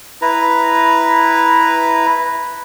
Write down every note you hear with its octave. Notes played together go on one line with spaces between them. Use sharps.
E4 B4 A#5